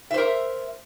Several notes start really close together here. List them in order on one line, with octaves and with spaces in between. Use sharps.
E5 C5 A#4